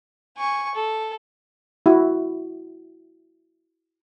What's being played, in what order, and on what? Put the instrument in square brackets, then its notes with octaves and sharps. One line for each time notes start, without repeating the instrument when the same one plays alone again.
[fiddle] G#5 C#6
A4
[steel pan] E4 F#4